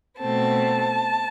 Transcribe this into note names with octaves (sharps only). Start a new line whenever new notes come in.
B2 A3 C4 A5